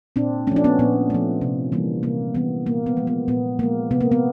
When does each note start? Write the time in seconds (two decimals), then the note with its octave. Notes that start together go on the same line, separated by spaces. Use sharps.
0.16 A#2 C4 D4
0.47 A3 C#4
0.52 F3 D4
0.64 B3 C#4
0.79 A#2 B3
1.10 F3 A3
1.41 C3
1.72 E3 G3 A#3
2.03 C3 A#3
2.34 E3 G3 A#3 B3
2.66 A#2 A#3
2.86 B3
2.97 F3 G#3
3.07 B3
3.28 A#2 B3
3.59 F3 G#3 A#3
3.91 C3 B3
4.01 A#3
4.12 B3